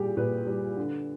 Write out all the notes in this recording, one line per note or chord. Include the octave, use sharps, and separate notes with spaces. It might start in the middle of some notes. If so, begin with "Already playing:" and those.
Already playing: A#2 G3 G4 G#4
A#2 B4
G3
D3